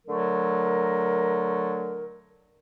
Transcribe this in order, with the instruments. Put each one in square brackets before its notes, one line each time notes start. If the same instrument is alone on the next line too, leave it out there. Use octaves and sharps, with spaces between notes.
[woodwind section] D3 F#3 A3 A#4